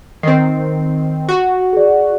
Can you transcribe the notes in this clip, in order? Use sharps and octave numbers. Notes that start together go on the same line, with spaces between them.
D#3 C4 C7
F#4
G#4 D5